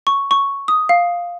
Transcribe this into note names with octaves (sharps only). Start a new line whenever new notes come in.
C#6
C#6
D#6
F5